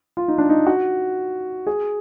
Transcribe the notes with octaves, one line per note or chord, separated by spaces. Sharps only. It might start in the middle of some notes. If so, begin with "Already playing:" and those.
F4
D#4
D4
D#4
F#4
G#4